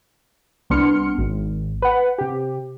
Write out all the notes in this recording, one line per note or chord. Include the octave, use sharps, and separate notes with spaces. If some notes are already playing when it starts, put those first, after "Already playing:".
C2 B3 D4 C6 F6 C#7
G#1
B4 F#5
C3 G4